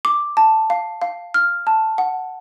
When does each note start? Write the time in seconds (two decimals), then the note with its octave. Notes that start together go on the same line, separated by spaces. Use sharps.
0.05 D6
0.37 A5
0.70 F5
1.02 F5
1.34 F6
1.67 A5
1.98 F#5